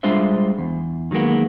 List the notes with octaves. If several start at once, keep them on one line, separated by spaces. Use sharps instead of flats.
G3 G#3 D4 F4 C5 E5
E2
D#3 F#3 G#3 A#3 B3